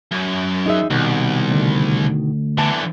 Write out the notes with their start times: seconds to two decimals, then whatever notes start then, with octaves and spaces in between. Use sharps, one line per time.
0.11 F#2
0.66 D#4 G#4 E5
0.90 C2 B2 D#3
1.51 D2
2.58 D3 E3 B3 A5